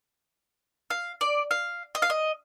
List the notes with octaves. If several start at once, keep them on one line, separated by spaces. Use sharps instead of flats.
F5
D5
F5
D#5
F5
D#5